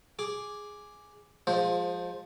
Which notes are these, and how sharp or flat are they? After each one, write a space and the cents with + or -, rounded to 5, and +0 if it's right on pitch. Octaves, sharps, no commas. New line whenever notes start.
G#4 +0 D6 +0
F3 +20 G#3 -10 C5 +0